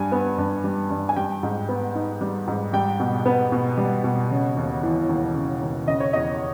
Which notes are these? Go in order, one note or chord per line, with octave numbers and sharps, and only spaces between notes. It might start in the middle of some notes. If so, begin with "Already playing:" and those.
Already playing: G2 G3 G#5
B3
G2
G3
G2
G#5
G3 G5
G#2
B3
D#4
G3
G#2
G3 G5
B2
B3
B2
G3
B2
C#3
D#2
E3
D#2
C#3
D#2
C#3 D#5
C#5
E2 D#5